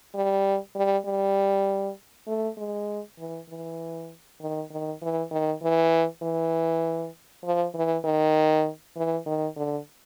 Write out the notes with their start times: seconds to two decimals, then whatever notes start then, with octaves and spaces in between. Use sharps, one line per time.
0.14 G3
0.75 G3
1.06 G3
2.27 A3
2.58 G#3
3.19 E3
3.49 E3
4.41 D#3
4.71 D#3
5.02 E3
5.31 D#3
5.62 E3
6.23 E3
7.44 F3
7.75 E3
8.05 D#3
8.96 E3
9.26 D#3
9.56 D3